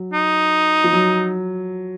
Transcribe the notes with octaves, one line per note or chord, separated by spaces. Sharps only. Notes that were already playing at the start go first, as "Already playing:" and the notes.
Already playing: F#3
D#4
F3
F#3